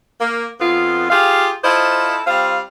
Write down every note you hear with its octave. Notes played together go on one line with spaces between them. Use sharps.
A#3
F2 B3 F4
F4 G4 G#4 F5
E4 F4 A4 C5 D#5
G3 C4 F4 F5